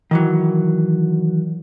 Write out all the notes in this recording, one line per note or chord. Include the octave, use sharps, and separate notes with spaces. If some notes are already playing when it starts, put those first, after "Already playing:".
D#3 E3 F#3